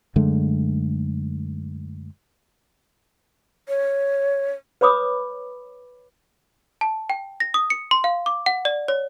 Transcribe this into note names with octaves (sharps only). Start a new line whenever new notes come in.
F#2 D3 G#3 A3
C#5
B4 C#5 B5 D6 D#6
A5
G5
A#6
D#6
C#7
C6
F5
D6
F#5
D5
C#5